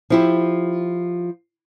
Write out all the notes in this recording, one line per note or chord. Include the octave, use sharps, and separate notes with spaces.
F3 E4 G4